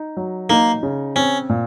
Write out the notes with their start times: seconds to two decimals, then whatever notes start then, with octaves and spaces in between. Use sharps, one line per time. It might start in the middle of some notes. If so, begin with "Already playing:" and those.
Already playing: D#4
0.17 F#3
0.50 A#3 D#4
0.83 C#3
1.16 C4 C#4
1.49 A#2